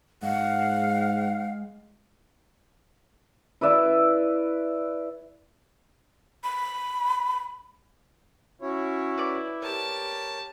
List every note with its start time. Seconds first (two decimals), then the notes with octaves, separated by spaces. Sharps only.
0.23 G#2 G#3 F5 F#5
3.61 E4 B4 D5 E5
6.44 B5
8.62 C#4 E4 F#4 C#5
9.18 B4 D5 D6
9.61 G4 A#4 C#5 A5